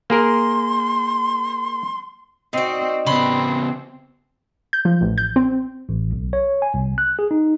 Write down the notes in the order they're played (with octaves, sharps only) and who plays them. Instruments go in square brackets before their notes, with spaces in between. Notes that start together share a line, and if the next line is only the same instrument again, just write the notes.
[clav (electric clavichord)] A#3 G#4 A#4 [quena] C6
[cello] C4 F#4 [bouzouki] D#4 D5
[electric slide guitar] C#3 B3 [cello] C4 [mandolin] B5 C6
[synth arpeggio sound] G6
F3
A1
G6
C4
[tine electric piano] A1
B1
C#5
G#5
C2
F#6
G#4
D#4